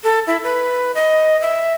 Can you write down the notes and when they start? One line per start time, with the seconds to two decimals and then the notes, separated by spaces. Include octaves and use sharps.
0.04 A4
0.27 E4
0.44 B4
0.95 D#5
1.41 E5